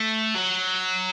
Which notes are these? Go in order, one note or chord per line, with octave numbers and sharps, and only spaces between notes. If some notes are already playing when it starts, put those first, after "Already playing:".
Already playing: A3
F#3